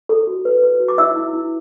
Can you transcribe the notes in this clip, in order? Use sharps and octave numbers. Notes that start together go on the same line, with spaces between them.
A4
F#4
B4
B4
F#4
D6
E4 E5 E6
E4
E4